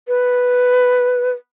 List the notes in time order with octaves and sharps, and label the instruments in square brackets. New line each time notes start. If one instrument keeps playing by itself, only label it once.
[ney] B4